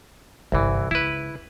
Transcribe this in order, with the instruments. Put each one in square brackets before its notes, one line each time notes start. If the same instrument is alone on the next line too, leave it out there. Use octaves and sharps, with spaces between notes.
[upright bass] G1 G#2 [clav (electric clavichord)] C2 E3
[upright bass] C#2 [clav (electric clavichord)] E4 B4